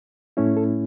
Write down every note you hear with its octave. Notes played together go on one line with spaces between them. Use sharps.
A2 A3 C#4 E4
A4